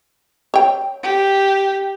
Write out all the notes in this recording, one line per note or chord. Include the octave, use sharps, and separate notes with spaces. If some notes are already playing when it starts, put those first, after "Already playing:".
C#5 G5
G4